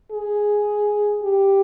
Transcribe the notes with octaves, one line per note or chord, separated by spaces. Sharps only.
G#4
G4